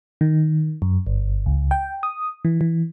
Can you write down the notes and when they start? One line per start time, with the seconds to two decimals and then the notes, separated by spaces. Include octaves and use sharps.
0.21 D#3
0.82 F#2
1.07 G1
1.46 C#2
1.71 G5
2.03 D#6
2.45 E3
2.61 E3